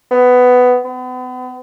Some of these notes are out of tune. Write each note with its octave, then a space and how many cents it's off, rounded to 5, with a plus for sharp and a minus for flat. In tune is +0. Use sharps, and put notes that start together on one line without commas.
B3 +15
B3 +40